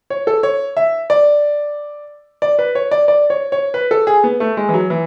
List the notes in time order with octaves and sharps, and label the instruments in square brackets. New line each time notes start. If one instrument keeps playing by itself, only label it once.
[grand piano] C#5
A4
C#5
E5
D5
D5
B4
C#5
D5
D5
C#5
C#5
B4
A4
G#4
B3
A3
G#3
E3
F#3
E3